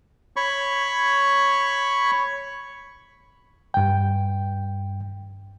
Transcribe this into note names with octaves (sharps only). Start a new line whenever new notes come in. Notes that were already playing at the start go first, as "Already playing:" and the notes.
C#5 B5 C#6
G2 G5